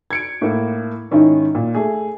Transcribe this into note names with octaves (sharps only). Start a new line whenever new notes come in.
G#6 C#7 D7
A2 A#3
G#2 D#3 C#4 D#4 E4
A#2
A3 G#4